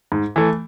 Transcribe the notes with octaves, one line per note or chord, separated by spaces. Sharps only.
G#2
E3 A3